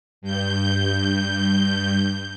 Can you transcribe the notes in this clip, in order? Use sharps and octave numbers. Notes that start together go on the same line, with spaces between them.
G2 G6